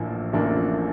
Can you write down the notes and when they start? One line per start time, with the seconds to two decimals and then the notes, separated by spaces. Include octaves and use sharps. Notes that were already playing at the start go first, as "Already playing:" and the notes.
Already playing: A1 A2 F3 A#3 D4
0.33 A1 A2 F3 A#3 D4